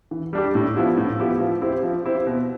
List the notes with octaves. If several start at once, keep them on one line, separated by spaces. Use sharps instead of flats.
E3
G3 D4 G4
A2
F3 B3 E4 G4
A2
F3 B3 E4 G4
F3
C4 E4 G4
F3
C4 E4 G4
B2